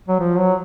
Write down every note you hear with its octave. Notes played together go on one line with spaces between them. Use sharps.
F#3
F3
F#3